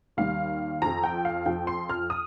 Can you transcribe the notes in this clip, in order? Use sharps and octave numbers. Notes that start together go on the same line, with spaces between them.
D#2 D#3 G3 F5
F2 F3 A#5
G5
F5
F2 F3 G5
C6
F6
D#6